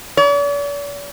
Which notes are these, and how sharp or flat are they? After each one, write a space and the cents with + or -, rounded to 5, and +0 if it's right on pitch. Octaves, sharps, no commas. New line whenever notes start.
D5 -45